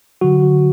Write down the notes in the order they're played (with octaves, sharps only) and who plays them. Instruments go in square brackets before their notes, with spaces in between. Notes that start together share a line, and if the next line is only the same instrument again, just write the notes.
[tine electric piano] D3 F#3 F#4